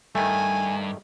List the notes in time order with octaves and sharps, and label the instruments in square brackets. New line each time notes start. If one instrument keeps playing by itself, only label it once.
[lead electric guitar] G2 [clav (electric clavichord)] D#3 A3 [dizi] G#5